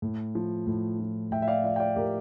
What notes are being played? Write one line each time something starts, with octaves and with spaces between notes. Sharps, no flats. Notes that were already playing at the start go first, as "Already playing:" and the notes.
A2
F3
A2
F3
A2 E5 G5
E5
D5 F5
F3 D5 F5
G5
D5 F5
A2 G4 A#4